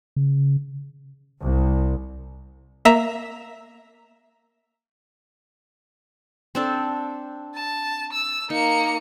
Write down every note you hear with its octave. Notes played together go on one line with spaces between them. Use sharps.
C#3
C2
A#3 E5 A#5 E6
C4 D4 A4
A5
E6
A#3 D#4 C#7